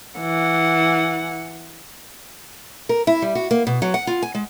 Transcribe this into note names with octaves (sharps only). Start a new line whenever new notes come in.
E3 F#5
A#4
E4
G3
F#4
A#3
B2
F#3
F#5
F4
G#5
G#3